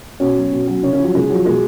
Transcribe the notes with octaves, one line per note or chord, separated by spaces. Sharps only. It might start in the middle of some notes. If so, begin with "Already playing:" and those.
B2 C#4
F#3
B2
F#3
C#3 C#4
C#4
F3
F#3
C#3 G#3
F3 F#3
B2 G#3